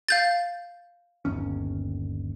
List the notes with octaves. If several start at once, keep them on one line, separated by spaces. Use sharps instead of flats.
F5 G6 A6
G1 D#2 C#4